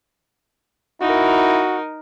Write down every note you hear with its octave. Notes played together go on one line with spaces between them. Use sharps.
D#4 E4 F#4 A#4